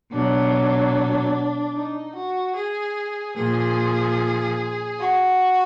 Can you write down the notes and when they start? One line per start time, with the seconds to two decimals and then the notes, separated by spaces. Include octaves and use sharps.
0.11 B2 F#3 D4
1.73 D#4
2.14 F#4
2.54 G#4
3.35 A#2 F3 G#4
4.98 F#4